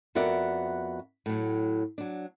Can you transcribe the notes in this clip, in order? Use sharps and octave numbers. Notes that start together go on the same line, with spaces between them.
F2 B3 F#4 A#4 D5 E5
A2 F#3
F#3 D4